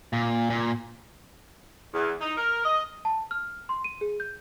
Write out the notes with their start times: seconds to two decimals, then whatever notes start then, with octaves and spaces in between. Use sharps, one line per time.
0.13 A#2
0.50 A#2
1.94 E2
2.21 D#4
2.37 A#4
2.65 D#5
3.05 A5
3.31 F6
3.69 C6
3.84 D#7
4.01 G#4
4.20 G6